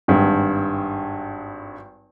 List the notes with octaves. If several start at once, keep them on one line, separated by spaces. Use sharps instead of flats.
G#1 G2